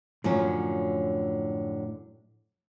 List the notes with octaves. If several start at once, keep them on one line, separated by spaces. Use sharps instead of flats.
F#2 A2 D3 F3 C#4